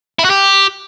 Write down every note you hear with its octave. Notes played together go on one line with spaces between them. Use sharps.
E4
F#4
G4